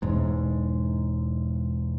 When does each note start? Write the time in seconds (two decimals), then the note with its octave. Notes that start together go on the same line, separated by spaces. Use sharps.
0.02 E1 G#2